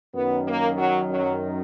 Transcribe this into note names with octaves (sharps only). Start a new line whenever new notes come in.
F#2 D#3 B3
A#3
F#3
F#3